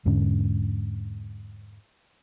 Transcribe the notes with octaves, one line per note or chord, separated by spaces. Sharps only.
E2 G#2 D3 C#4